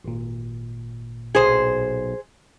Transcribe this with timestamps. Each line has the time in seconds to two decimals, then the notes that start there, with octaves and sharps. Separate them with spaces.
0.04 G#1 A#2
1.35 B1 G#4 C5